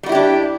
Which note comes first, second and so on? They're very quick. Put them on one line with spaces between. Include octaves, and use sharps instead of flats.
G3 F#4 E4 G4 D4